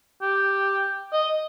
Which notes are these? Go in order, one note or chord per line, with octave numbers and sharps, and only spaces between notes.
G4
D#5